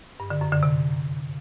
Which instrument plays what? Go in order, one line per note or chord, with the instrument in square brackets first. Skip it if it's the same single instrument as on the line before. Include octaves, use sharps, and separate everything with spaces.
[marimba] G2
D3
F#2
D3
C3